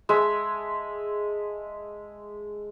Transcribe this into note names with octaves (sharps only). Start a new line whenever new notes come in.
G#3 E5 A5